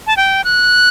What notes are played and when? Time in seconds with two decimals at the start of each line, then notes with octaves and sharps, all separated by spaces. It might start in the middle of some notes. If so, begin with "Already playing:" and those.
0.07 A5
0.17 G5
0.44 F#6